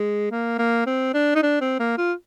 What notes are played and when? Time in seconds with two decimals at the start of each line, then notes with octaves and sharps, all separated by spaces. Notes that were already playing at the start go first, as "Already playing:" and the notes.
Already playing: G#3
0.31 A#3
0.58 A#3
0.86 C4
1.14 D4
1.35 D#4
1.43 D4
1.61 C4
1.79 A#3
1.98 F4